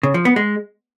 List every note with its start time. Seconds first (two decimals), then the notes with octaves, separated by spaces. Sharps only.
0.03 C#3
0.14 F3
0.25 B3
0.36 G#3